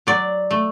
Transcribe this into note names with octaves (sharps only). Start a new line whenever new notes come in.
F#3 D5
A3